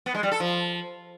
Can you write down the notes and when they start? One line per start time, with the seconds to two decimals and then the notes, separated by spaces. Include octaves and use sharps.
0.06 B3
0.15 G#3
0.23 G3
0.32 A4
0.40 F3